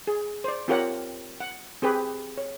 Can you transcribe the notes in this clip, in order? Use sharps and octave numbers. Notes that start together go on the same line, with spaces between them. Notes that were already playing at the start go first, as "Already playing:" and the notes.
G#4
C5 D5
C4 F4 G4 A#4 C#5 F#5
F#5
C4 G4 G#4 B4
C#5